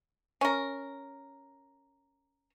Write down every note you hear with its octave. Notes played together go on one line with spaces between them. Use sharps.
C#4 A#4